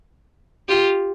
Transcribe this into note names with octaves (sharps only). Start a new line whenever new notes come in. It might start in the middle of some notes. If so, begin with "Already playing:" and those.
F4 G4